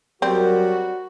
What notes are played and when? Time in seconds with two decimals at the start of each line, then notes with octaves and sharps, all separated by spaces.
0.22 F#3 G3 C4 F#4 A#4